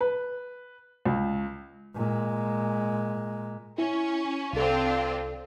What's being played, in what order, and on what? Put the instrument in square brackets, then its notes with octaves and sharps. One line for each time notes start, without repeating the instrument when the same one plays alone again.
[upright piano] B4
C#2
[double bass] A#2 G#3
[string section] C#4 [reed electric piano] E4
[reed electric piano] C2 A4 [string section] C4 D4 F4